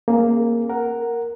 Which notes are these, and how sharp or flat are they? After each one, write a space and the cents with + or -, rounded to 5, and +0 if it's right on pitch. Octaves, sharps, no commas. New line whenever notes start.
A#3 +0 C#4 -35 G#4 +15
A#4 +0 F#5 +0